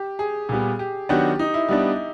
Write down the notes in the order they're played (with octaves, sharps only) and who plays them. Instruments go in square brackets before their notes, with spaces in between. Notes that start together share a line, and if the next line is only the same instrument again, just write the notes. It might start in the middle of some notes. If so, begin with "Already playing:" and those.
Already playing: [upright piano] G4
G#4
[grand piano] A#2 G3 B3
[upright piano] G4
[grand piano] D#3 F#3 B3 D4 F#4 [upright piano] G4
[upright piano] D#4
E4
[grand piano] G3 B3 D4